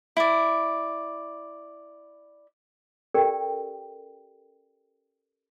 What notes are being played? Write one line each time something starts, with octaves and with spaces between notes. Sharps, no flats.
E4 D5
C#4 G4 A4 A#4 D5 G5